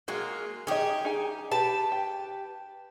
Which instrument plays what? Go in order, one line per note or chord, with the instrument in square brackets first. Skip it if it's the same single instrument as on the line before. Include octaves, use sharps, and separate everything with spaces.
[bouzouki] G#3 A#3 F4 [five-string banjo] F#4 G#4
[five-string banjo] D#3 D#5 [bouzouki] G4 G#4
[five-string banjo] D#4 G#5
[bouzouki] G4 B4 A5
[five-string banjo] G5